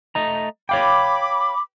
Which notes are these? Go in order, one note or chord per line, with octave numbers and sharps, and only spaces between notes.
A3 D#5 A#5
C#5 F5 G5 B5 D6